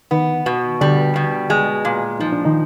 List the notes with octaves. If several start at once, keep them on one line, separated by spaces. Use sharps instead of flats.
D#3 B3 D#4
B2
D3 G3 D4
B2
G#3
A#2
F3 D#4
D4
D#3 D#4